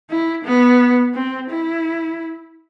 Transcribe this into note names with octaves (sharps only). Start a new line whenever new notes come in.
E4
B3
C4
E4